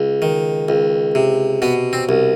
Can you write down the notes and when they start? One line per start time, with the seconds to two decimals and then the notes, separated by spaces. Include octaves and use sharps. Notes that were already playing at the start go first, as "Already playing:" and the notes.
Already playing: C#2
0.22 D#3
0.69 C#2
1.15 C3
1.62 B2 B3
1.93 C4
2.09 C2